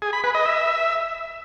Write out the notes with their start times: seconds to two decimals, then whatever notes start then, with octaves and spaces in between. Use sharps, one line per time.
0.02 G#4
0.13 B5
0.24 B4
0.35 D#5
0.46 E5